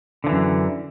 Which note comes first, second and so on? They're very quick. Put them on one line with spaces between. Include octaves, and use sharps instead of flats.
D3 F3 E3 F#2